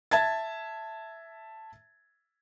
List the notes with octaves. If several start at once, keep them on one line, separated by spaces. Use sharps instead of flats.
E5 A5 G#6 A6